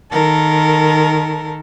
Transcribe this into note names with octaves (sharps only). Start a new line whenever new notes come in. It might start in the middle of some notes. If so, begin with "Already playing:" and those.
D#3 A4 A#4